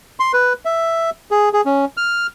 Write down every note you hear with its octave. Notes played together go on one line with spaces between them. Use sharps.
C6
B4
E5
G#4
G#4
C#4
F6